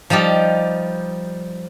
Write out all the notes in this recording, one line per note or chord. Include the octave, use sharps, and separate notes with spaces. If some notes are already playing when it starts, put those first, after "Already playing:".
F3 G3 D#4 G4